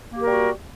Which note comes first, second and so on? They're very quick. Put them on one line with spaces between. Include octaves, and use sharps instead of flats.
A#3 G4 A#4 G3 F#4